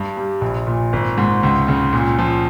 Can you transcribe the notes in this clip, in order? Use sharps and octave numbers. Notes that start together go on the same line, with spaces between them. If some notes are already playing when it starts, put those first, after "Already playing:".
Already playing: G2
G3
A#1
A#2
G#1
G#2
C#2
C#3
A#2
F3